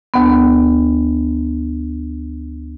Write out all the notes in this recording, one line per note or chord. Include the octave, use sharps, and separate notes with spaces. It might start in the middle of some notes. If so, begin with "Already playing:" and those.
D2 B3